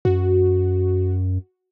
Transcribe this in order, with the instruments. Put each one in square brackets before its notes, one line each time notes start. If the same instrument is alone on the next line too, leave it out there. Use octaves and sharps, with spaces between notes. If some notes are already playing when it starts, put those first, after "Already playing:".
[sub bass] F#2 [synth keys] F#4